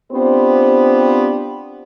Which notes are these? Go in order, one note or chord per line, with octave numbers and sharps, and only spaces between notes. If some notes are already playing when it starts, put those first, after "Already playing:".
B3 C4 D4 F4 G4 C5